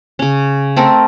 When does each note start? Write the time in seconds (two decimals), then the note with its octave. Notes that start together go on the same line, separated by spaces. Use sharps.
0.19 C#3 C#4
0.76 A3 C4 A4 A#4